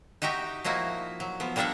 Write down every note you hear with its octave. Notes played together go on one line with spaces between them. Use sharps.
D#4 F#4 G4 E5 G5
F3 A#3 D#4 E4 F#4
F#3
F3 B3
G3 A#3 D4 A4 E5 F#5